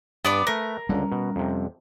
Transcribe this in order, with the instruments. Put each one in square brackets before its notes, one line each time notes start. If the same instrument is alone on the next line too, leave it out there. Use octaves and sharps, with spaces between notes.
[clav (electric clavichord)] G2 [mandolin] B3 D5 D6
[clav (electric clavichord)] A3 B4 [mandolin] A#4
[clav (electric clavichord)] C#2 D3 [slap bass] G3 B3 C#4
[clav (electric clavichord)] B2
F2 C3